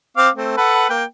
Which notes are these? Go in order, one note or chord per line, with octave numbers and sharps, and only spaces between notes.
C4 F5 D6
A3 C4
A4 B4 F#5
A#3 G5